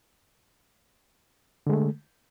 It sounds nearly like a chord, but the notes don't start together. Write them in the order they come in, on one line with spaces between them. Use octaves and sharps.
D3 G#3 A3